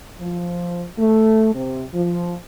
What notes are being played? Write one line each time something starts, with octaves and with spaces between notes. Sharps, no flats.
F3
A3
C3
F3